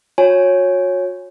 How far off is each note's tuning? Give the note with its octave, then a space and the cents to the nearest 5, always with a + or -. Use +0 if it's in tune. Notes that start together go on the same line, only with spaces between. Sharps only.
F#4 -35 C#5 -10 G#5 +0